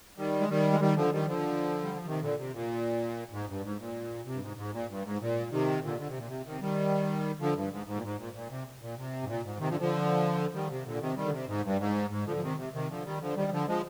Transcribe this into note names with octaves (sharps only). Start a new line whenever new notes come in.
D#3 G3
G#3
D#3 G3
G#3
D#3 G3
D3 F3
D#3 G3
D3 F3
G3
F3
C3 D#3
A#2 D3
C3
A#2
G#2
G2
G#2
A#2
C3
G2
G#2
G#2
A#2
G2
G#2
A#2
C3 D#3
A#2 D3
D3
C3
A#2
C3
C3 D#3
D#3 G3
D3 F3
G2
G#2
G#2
A#2
G#2
A#2
A#2
C3
A#2
C3
G#2
A#2
G#2
C3 D#3
D3 F3
D3 F3
D#3 G3
C3
A#2 D3
C3 D#3
D#3 G3
D3
C3
G#2
G2
G#2
G#2
D3 F3
F3
C3 D#3
C3
C3 D#3
D3 F3
D#3 G3
D3 F3
D#3 G3
D3 F3
F3 G#3